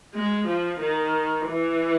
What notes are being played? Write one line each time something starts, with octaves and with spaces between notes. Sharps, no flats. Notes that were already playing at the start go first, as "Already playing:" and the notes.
G#3
F3
D#3
E3